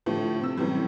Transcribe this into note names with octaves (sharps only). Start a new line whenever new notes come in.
A2 D3 F3 A3 G4
C3 E6
F#2 A2 C3 E3 G3